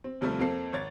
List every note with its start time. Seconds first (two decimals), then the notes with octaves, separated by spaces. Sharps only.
0.04 C4
0.21 D#2 C3 F3 G3 A3
0.39 F2 A#3 C4 A4 C7
0.73 G#1 C#5 G#6 A6